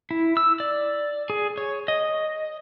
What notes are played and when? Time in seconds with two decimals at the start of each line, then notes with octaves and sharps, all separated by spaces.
0.11 E4
0.37 E6
0.60 D5
1.30 G#4
1.58 C#5
1.88 D#5